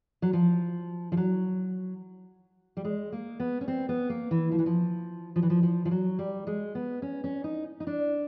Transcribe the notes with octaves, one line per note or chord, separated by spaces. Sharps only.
F#3
F3
F3
F#3
G3
G#3
A#3
B3
C#4
C4
B3
A#3
E3
F3
E3
F3
F3
E3
F3
F3
F3
F#3
G3
G#3
B3
C#4
C#4
D#4
D#4
D4